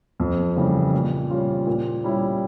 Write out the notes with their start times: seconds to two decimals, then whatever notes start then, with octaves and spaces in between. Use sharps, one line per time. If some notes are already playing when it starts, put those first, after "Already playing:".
0.20 F2
0.56 C#3 E3 G3 A#3
0.94 A#2
1.30 G3 C#4 F4
1.66 A#2
2.04 G3 C#4 E4